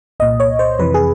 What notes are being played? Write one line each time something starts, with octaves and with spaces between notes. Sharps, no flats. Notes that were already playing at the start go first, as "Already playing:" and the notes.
C2 A#2 D#5
C#5
C5
F2 C3 E3 B4
G#4